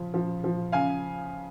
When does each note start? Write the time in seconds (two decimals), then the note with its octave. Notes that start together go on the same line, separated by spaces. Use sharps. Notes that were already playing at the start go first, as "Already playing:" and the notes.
Already playing: C#3 F3
0.14 F3
0.44 F3
0.72 C#3 F5 G#5